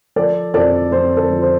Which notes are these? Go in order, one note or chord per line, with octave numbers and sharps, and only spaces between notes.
F3 A4 D5
F2 A4 D5
F2 C5
A4
F3
C5